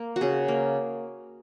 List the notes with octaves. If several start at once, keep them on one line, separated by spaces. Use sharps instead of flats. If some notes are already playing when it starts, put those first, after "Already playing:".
Already playing: A#3
F#4
C#3 G#4
A#3